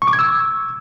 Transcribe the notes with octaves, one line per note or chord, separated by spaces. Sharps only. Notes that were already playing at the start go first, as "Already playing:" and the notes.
C#6
D6
G#6
E6